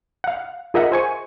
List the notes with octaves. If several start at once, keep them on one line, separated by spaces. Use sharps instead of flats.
F5 F#5
F4 G#4 A#4 D#5 E5 F#5
C5 G#5 C#6